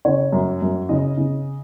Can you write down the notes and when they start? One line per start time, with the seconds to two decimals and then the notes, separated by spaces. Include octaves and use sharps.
0.05 C#3 C#5
0.32 F#2
0.62 F#2
0.89 C#3 D#5
1.17 C#3